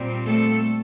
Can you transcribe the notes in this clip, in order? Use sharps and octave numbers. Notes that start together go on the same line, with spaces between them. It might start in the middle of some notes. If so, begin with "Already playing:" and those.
Already playing: A#2 G3 C4
A3 A4